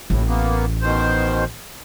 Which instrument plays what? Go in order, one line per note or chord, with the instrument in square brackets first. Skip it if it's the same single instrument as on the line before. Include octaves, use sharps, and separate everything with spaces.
[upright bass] A1 [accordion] A2
[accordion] A#3 B3
B2 D#3 C5